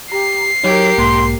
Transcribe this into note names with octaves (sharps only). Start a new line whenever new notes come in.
G4 A#5 C7
F#3 D#4 G4 A#4 C#5
B1 G#2 A#3 C6